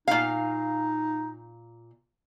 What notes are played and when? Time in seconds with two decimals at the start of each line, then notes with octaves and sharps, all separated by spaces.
0.08 A#2 D#4 F5